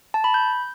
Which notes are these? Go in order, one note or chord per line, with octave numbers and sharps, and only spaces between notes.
A5
B5
G6